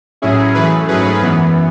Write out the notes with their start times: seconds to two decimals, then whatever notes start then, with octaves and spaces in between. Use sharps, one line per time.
0.22 A2 F#3 C#4 E4 G#4
0.55 F#2 E3 A3 G#4 B4
0.88 G#2 F#3 A3 C#4 G#4 B4
1.22 F#2 E3 B3